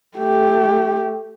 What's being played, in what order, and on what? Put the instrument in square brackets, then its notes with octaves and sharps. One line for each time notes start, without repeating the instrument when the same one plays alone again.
[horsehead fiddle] A3 G4